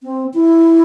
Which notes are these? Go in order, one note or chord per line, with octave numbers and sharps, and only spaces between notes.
C4
E4